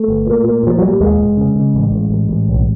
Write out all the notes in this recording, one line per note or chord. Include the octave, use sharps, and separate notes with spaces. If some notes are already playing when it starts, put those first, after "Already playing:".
Already playing: A3
G1
A#2
A#2
A#2 F3
A#2 F#3
G3
D#2 G#3
F1
C#3
C#3
A1
A1
A1
A1
B1